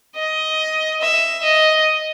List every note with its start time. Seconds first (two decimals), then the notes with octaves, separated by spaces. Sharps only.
0.15 D#5
1.01 E5
1.44 D#5